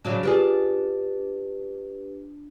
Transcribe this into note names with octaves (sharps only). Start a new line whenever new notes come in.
C#3 F#3 D4
D4 F4 G4 G#4 B4